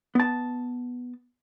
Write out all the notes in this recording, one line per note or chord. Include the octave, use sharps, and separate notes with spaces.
B3 A5